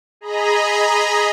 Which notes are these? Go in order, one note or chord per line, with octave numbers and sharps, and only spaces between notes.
G#4 D#5 A#5 B5